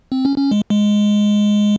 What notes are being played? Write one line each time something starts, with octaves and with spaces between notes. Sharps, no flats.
C4
C#4
C#4
G#3
G#3